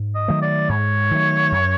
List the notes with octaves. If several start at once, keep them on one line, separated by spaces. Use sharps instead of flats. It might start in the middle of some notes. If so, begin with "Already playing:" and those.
Already playing: G#2
D#5
D#3 F#3 A3
D5
G#2 C#5
D#3 F#3 A3
F#2